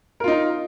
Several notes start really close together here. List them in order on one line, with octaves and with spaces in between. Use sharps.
A#4 F4 D#4